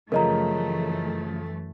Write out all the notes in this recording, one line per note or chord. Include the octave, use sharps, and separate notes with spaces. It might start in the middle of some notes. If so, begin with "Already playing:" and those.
F#2 C#3 E3 F3 A3 A#4 D#5 A#5